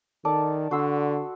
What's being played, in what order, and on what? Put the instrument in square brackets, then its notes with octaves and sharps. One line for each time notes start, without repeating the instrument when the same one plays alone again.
[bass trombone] D#3 [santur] A4 D5 A5
[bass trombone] D3 [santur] F#4 C6 E6